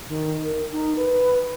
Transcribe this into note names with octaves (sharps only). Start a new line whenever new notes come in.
D#3
A#4
D#4
B4